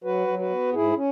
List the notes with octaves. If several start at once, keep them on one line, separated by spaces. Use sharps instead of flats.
F#3 F#4 B4
F#3
F#4 B4
B3
G#2 E4 G#4
C#4